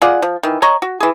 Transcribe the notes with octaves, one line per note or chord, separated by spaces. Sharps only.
F4 G#4 D5 F#5
F3
D#3 E3
C#5 D#5 A#5 C#6
F#4
E3 G#4